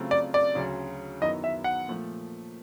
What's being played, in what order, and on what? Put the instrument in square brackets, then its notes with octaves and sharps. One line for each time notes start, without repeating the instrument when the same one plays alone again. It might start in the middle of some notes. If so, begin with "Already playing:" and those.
Already playing: [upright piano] C#3 F#3 A3 C4 F4
[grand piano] D5
D5
[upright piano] D2 C#3 F#3
[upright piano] F#2 D#3 F#3 B3 E4 [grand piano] D#5
[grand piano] E5
F#5
[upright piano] A#2 F3 A3